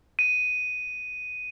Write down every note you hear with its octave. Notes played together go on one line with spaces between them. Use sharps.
D#7